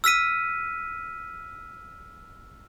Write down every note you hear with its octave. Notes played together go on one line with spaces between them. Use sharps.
E6 F6 B6 D#7